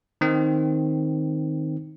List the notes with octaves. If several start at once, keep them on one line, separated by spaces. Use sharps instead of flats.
D#3 C4